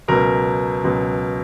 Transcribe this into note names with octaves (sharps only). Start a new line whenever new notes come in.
C#2 B2 F#3 A#4
C#2 B2 F#3